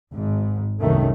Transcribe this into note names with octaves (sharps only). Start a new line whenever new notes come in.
G#1 G#2
C2 F#2 D#3 A3